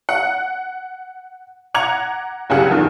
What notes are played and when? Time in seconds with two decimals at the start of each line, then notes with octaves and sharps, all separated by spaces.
0.09 F#5
1.75 F#5 A#5 D6 G#6 F7
2.50 C2 F#2 C#3 G4 G#4 F#5
2.71 E2 D#3 F3